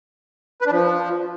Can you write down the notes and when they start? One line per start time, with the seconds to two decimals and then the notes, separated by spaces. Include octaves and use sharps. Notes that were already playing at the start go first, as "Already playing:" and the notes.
0.61 B4
0.67 D4
0.72 F3